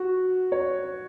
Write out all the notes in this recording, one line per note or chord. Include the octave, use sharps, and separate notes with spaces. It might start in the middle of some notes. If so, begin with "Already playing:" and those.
Already playing: F#4
C#5